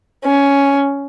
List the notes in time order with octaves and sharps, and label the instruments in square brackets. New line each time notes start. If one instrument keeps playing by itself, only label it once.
[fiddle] C#4